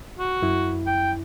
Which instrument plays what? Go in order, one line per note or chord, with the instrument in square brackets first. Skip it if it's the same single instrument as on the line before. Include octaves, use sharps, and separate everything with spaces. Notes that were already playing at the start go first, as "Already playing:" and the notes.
[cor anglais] F#4
[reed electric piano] F#2 E4
[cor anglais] G5